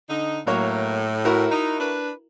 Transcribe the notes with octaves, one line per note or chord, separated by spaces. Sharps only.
D3 D#4
A2 F#3 A#3 C#5
E4 F#4 A#4
D#4
D4 B4